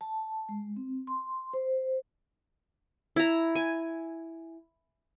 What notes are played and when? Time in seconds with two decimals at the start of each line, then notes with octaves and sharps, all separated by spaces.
0.01 A5
0.49 G#3
0.76 C4
1.07 C6
1.53 C5
3.16 E4 A#5
3.55 G#5